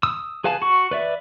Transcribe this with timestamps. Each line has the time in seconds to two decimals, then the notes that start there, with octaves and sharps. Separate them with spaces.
0.03 D#6 E6
0.44 G#4 B4 F5 G#5 A5
0.62 F#4 C#6
0.91 B4 D5 E5